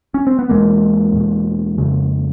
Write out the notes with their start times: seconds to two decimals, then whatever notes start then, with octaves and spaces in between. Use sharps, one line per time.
0.14 C#4
0.27 C4
0.39 B3
0.49 E2 B2 G#3 A#3
1.13 E2 B2
1.78 F2 C#3